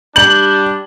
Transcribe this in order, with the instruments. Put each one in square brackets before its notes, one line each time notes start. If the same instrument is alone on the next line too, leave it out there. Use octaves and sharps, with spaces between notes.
[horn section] G3 D4 [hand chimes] G6 [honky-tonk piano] F#7